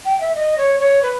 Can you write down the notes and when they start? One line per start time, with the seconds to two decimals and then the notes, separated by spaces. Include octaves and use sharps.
0.05 G5
0.21 E5
0.36 D#5
0.58 C#5
0.80 C#5
1.03 B4